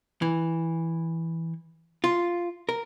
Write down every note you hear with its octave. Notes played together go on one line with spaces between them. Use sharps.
E3
F4
A#4